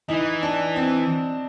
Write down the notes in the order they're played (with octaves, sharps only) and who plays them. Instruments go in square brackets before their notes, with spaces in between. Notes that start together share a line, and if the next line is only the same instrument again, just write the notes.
[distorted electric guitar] E3 [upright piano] D#4
[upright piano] D4
C4